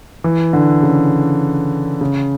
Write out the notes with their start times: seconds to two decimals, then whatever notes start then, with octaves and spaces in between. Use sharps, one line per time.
0.24 E3
0.53 D3
0.83 C#3
2.01 C#3